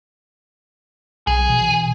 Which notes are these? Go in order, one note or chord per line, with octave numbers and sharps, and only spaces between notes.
B1 G#4
B2 E3